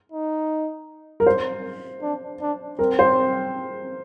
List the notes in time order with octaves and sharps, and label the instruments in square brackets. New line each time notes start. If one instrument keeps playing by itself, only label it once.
[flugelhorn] D#4
[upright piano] A#4
C5
[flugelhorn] D4
D4
[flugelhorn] C4 [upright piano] A#4
[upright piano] C5